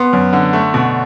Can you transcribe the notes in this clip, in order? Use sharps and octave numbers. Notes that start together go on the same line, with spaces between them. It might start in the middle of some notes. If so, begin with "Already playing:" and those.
Already playing: B3 C6
F#2
D3
A3
B2